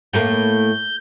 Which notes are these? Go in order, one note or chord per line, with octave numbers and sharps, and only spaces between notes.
A2 A3 A#3 G6